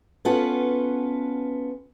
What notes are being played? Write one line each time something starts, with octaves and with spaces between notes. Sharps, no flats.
B3 C#4 F4 A4 B4 F#5